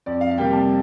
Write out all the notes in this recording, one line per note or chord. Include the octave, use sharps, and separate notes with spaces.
F2 D5
F5
F5
C3 G3 A#3 G5
A5